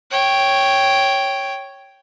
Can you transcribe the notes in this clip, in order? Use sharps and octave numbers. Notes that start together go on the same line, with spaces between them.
C#5 G5